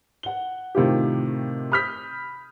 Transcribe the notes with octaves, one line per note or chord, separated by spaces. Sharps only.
F#5 G7
A2 C3 D#3 F4 G4
B5 D#6 F6 G6 B6